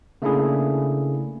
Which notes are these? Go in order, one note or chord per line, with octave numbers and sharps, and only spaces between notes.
C#3 A3 A#3 D4 E4 G#4